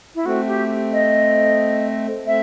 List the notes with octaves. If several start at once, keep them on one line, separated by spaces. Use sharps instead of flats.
E4
A3 C4 F#4
G4
D#5
A3 C4 E5